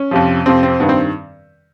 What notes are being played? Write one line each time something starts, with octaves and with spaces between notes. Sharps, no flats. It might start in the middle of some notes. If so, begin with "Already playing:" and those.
Already playing: C#4
F2 C3 F3
F2 C3 F3 C4
C4
G2 D#3 B3
C4